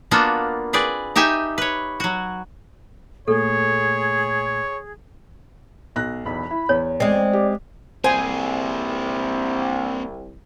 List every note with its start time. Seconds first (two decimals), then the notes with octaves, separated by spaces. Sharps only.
0.11 A#3 B3 D4 F4 F#4 A4
0.73 C4 G#4 B4 D5
1.16 D#4 G4 E5 G5 G#5
1.58 B4 C#5
2.00 F#3 F#4
3.28 A#2 A3 G#4 A4 C#5
5.96 B1 F#6 A#6
6.26 B1 E2 B5
6.51 E4
6.69 E2 C#5
7.00 G#3 C4 D5
7.33 G4
8.04 C2 A#3 C4 G#4 C5 G#5